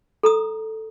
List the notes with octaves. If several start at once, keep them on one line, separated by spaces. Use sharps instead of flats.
A4 A#5 D#6